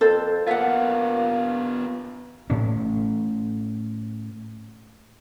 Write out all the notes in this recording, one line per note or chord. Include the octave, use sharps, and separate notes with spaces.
F2 A4 C5
A#3 B3 F4 E5 F#5
A2 C#4